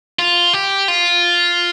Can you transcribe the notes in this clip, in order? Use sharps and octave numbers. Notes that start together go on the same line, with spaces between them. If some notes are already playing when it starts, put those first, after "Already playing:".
F4
G4
F4